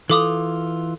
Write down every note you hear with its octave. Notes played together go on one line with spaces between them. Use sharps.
E3 F4 A4 D6 D#6